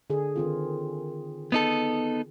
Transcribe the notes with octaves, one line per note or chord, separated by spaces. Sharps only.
D3 G#4
D#3 C4 F4
B3 D#4 A4